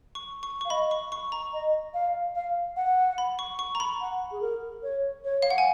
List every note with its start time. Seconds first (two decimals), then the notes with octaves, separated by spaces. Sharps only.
0.15 C#6
0.43 C#6
0.61 F5 C#6
0.70 D#5 B5
0.91 C#6
1.12 C#6
1.32 A#5
1.53 D#5
1.94 F5
2.35 F5
2.76 F#5
3.18 B5
3.39 C#6
3.59 C#6
3.75 A#5
3.80 B5
4.01 F#5
4.31 G#4
4.41 A#4
4.83 C#5
5.24 C#5
5.42 F5
5.50 F#5
5.58 G#5